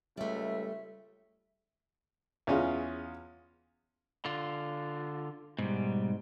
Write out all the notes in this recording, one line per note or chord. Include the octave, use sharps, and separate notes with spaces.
C#2 G3 A3 E5
E2 C#4 F4 G#4
D3 F4
G#2 B2 G3